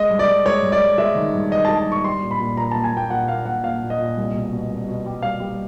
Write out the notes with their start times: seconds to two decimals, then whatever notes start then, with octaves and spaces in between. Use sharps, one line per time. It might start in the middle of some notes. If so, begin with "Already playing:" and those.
Already playing: G#3 D#5
0.10 G2
0.19 D5
0.28 G2
0.46 G#3 C#5
0.62 G2
0.72 D5
0.81 G2
0.98 G#3 E5
1.15 D#3
1.33 G2
1.52 D#3 D#5
1.65 A5
1.69 G#3
1.77 A5
1.87 G2
1.92 C#6
2.04 G3 C6
2.22 A#2
2.31 B5
2.40 A#2
2.57 A#2 A#5
2.71 A#3 A5
2.84 G#5
2.93 A#3 G5
3.10 A#2 F#5
3.28 A#3 F5
3.46 A#2 F#5
3.64 A#2 F5
3.82 A#2
3.90 D#5
3.99 A#2
4.17 C2
4.35 B2
4.52 B2
4.70 C2
4.88 B2
5.06 G3
5.22 G3 F5
5.40 G3